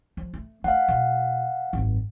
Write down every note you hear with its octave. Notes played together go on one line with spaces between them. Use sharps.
F3
A3
A3 F5 F#5
B2
G#1 F#2